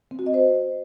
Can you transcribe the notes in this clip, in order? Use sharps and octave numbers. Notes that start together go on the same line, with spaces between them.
C4
F#4
D#5
C5